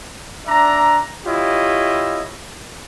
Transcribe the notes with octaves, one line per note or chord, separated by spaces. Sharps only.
D4 D5 E5 A#5
E4 F4 G4 C#5 D#5